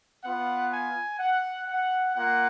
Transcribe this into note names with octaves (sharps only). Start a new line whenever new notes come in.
B3 F4 F#5
G#5
F#5
F#5
A#3 F4 F#5